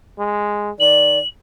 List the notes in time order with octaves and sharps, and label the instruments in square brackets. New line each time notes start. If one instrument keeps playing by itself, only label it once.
[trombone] G#3
[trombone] D#3 [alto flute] D5 [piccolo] F#7